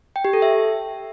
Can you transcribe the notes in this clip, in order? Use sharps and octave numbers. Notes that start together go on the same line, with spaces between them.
G5
G4
A4
E5